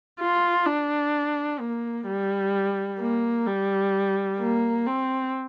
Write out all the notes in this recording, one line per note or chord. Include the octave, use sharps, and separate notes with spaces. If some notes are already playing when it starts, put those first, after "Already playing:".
F4
D4
A#3
G3
A#3
G3
A#3
C4